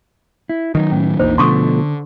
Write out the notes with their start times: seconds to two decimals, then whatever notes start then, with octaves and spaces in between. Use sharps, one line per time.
0.49 E4
0.75 D#3 F3 F#3 D#4
0.91 A2 C#4
1.19 A#1 E2 A#2 D#4 C5
1.38 B2 D3 F3 A3 C6 C#6 D#6